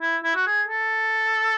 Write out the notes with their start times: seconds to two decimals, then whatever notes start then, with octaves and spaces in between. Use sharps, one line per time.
0.01 E4
0.24 E4
0.35 F#4
0.46 G#4
0.68 A4